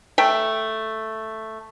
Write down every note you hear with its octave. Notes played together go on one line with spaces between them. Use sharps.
A3 E5 G5